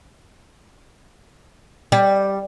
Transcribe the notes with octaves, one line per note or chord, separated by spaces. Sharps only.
G3